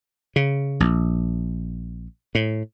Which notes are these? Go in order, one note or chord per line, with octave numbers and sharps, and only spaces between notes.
C#3
A#1
A2